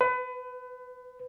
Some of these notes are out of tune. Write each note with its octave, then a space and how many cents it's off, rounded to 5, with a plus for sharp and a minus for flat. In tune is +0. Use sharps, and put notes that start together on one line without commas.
B4 +30